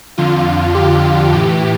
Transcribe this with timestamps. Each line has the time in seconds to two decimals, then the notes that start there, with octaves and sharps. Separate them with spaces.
0.18 F2 D3 F4
0.75 G4
1.33 A2 E3 G4